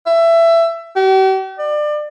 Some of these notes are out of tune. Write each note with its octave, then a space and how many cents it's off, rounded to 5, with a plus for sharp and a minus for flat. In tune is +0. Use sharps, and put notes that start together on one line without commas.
E5 +20
G4 -45
D5 +30